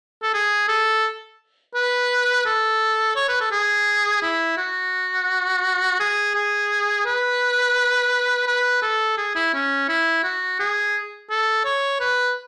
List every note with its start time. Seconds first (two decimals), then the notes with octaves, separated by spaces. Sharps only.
0.22 A4
0.34 G#4
0.68 A4
1.75 B4
2.46 A4
3.16 C#5
3.28 B4
3.40 A4
3.51 G#4
4.22 E4
4.57 F#4
6.00 G#4
6.35 G#4
7.06 B4
8.47 B4
8.82 A4
9.18 G#4
9.35 E4
9.54 C#4
9.88 E4
10.24 F#4
10.59 G#4
11.30 A4
11.65 C#5
12.00 B4